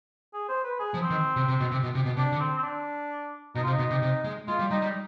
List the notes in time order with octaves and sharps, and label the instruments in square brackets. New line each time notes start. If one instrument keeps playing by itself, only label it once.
[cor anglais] G#4
C5
B4
G#4
[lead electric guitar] F3
[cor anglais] C4
[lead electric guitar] D#3
C3
C3
B2
C3
B2
C3
B2
[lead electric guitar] C3 [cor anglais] D4
[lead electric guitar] D3
[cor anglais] C4
C4
D4
[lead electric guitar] B2 [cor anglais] D#4
[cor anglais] F4
[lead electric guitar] C3
[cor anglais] D#4
[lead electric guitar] B2
C3
C3
G#3
[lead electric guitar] G#3 [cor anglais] F4
[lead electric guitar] G3
[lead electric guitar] G3 [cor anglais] D#4
[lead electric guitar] G3